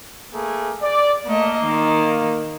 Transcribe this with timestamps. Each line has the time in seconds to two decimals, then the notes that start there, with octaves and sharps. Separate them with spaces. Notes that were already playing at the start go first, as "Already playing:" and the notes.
0.34 A3 A#3 G#4
0.82 D5
1.26 A3 A#3 D#5
1.63 D#3